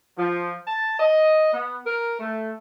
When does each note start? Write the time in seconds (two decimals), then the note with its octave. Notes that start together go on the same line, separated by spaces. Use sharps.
0.16 F3
0.67 A5
0.99 D#5
1.52 B3
1.86 A#4
2.19 A3